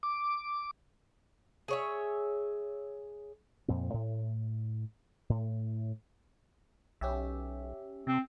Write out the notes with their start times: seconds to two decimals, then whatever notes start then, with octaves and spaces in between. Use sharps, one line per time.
0.03 D6
1.68 G#4 C#5 E5
3.68 F2 A#2 C4
3.94 A2
5.30 A2
7.01 B1 C#4 G4 E5
8.07 C3 C4